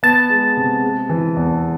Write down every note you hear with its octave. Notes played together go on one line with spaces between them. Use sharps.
B3 A5
G#3
C3
G#3
E3
E2